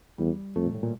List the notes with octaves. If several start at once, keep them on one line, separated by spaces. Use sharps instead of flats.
E2 G3
F2 A3
A#2
A2
A#2